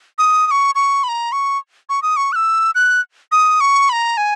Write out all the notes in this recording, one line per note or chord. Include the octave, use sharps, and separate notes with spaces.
D#6
D#6
C#6
C#6
B5
A#5
C#6
C#6
D#6
C#6
F#6
E6
F#6
D#6
C#6
B5
A#5
G#5